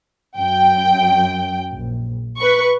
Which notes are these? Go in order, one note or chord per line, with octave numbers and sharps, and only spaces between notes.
F#2 G5
A#1
B4 C#6